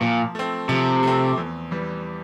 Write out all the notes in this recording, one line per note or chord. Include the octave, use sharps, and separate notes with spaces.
A#2 F3
A3 C4
C3 F3
A3 C4
E2
E3 G3